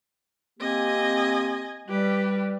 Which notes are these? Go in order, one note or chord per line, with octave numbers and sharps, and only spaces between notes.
A#3 C4 G4 D#5 G#5
G3 G4 B4